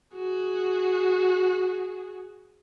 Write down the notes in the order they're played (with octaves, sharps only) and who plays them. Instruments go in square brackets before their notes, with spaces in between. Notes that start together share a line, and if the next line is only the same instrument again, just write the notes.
[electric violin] F#4 G#4